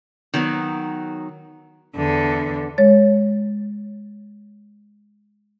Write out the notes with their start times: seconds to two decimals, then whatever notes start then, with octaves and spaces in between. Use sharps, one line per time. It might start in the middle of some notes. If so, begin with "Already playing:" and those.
0.34 D#3 F#3 B3
1.96 E2 D3
2.78 G#3 C#5 A6